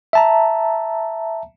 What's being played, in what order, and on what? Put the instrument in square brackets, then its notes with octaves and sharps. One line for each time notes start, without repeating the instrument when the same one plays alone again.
[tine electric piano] E5 A5 A#5